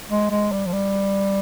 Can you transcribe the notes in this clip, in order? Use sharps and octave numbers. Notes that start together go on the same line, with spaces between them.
G#3
G#3
G3
F3
G3